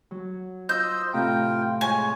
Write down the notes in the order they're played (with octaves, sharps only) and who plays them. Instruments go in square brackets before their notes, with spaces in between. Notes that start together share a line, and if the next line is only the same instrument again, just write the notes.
[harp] F#3
[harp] F4 [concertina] C5 D#5 E6 [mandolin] G6
[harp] A2 C3 A#5 [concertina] F4 G5
[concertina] G#3 C#5 [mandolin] G#5